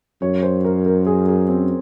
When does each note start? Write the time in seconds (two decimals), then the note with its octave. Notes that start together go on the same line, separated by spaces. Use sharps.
0.22 F#2 C#5
0.43 C5
0.65 A#4
0.86 A#4
1.06 G#4
1.28 G#4
1.48 C4